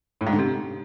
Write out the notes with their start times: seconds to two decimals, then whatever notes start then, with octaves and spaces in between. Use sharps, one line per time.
0.21 A2
0.27 G#2
0.32 D3
0.38 C3